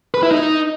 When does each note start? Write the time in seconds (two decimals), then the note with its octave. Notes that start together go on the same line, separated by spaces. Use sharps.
0.14 B4
0.23 E4
0.31 D#4